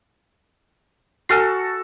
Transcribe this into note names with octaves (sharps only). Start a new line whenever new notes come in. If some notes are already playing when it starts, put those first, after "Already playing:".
F#4 A4 G#5 F6 C7